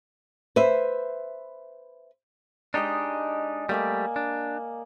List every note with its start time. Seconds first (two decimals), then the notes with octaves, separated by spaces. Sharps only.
0.56 B4 C5 E5
2.74 G#3 D4 D#4 G4 D#5
3.69 G3 A3 A#3 D5 G#5
4.16 D4